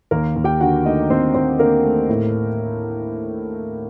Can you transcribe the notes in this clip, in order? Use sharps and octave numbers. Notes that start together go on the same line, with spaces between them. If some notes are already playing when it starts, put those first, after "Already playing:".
D#2 A#3 A#4
D#2
G4 G5
D3 F#4 F#5
A3 D#4 D#5
D#2 C4 C5
D#2 C4 C5
D3 A#3 A#4
A3
A2